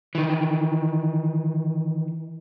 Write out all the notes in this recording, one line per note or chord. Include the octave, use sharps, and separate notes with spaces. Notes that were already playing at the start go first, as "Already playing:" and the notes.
D#3 E3